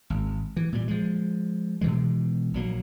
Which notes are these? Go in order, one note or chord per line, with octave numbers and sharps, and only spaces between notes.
G#1
E3
A#2 G3
F3 G#3
B2 D#3 E3 G#3
A#1 F#3 A#3